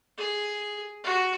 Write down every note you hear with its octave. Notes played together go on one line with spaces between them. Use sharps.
G#4
F#4